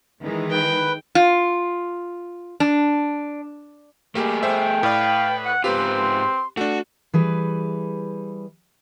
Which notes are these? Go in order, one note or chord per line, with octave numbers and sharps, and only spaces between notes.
D#3 E3 G#3
B4 G5
F4
D4
G3 A3 A#3 G4 G#4
C5 E5 G5
A2 B4 D5 F5
F#5 F#6
G#2 C4 F4 G4 B4 C6
A3 D4 F#4
E3 G3 G#4 B4